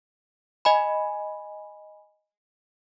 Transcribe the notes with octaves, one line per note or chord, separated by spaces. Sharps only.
D#5 G#5 B5